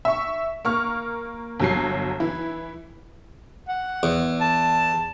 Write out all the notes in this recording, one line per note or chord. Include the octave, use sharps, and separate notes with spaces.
E5 C#6
A#3 C#6 F6
G1 F#3 C7
E3 E4
F#5
E2
A5